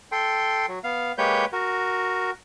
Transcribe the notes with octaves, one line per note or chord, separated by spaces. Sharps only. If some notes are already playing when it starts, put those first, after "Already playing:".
A4 G5 C6
F#3
B3 F5
G#3 A#3 G4 B4 C#5 G6
F#4 A#4